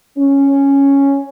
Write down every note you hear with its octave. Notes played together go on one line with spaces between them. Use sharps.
C#4